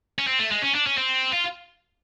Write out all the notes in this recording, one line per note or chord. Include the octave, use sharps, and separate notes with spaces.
C#4
C4
A3
G#3
C#4
D4
C#4
C4
F4